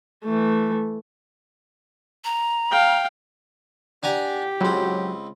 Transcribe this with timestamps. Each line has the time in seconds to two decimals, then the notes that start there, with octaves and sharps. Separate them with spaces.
0.25 E3 A3
2.25 A#5
2.71 F5 G5
4.03 D4 G4 F#5 G#5 A#5
4.61 C#2 F#3 C4 B5 C6